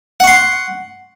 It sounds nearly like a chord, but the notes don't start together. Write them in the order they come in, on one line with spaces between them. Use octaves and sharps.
F#5 C#6 C6